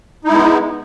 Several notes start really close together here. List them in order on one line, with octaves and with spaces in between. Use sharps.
D#4 E4 G#3 B3